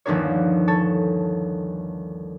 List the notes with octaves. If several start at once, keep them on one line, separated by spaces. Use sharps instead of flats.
G1 D#2 F3 D4 A#4 C#5
A4 C#5 A5